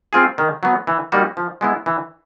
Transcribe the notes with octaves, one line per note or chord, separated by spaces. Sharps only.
C4 F4 G#4
D#3
F#3 B3
E3
G3 A#3 D#4 F#4
F3
G#3 B3 E4
E3